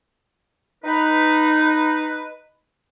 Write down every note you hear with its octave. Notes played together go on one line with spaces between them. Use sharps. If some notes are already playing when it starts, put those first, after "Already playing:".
D#4 B4